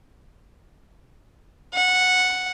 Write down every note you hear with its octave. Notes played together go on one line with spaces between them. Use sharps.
F#5